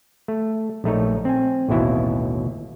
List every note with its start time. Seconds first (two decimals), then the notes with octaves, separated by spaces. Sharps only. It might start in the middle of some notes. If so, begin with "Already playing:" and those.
0.28 A3
0.84 A#1 A3 D#4 C#5
1.25 C4 G#5
1.69 A1 D#2 B2 E4 E5